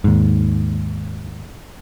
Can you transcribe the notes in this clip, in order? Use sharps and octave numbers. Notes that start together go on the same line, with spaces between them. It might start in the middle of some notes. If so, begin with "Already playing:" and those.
D#2 G#2